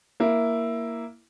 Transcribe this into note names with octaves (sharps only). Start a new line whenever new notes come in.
A#3 E4